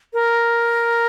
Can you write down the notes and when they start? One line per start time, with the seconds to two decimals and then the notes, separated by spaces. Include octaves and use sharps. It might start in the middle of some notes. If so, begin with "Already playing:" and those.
0.13 A#4